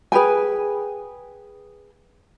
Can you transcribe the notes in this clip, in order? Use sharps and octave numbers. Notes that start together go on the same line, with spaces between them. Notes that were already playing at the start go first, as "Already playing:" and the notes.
G#4 B4 G5 G#5